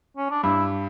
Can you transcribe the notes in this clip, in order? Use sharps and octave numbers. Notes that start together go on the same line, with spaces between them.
C#4
D4
G2 E4